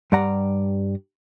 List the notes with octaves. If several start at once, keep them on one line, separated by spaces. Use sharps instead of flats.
G2 G3 D5 F#5 A#5